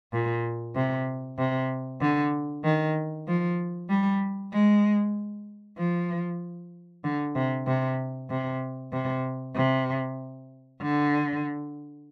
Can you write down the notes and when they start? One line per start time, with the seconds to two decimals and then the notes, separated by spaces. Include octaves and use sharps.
0.13 A#2
0.75 C3
1.38 C3
2.01 D3
2.64 D#3
3.27 F3
3.89 G3
4.53 G#3
5.78 F3
7.04 D3
7.35 C3
7.67 C3
8.30 C3
8.92 C3
9.56 C3
10.81 D3